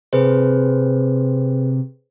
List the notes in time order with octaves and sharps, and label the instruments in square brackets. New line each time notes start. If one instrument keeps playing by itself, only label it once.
[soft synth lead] C3 [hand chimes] G#4 B4 C5